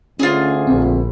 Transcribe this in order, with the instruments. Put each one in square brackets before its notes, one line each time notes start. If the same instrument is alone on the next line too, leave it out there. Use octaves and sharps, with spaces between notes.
[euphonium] D2 [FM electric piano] C#4 [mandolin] F4 G#4
[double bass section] A#1 [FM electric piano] C4